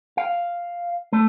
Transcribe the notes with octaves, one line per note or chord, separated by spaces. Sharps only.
F5
A3